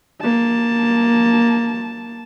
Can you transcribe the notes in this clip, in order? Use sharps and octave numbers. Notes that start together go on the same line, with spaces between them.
A#3 A5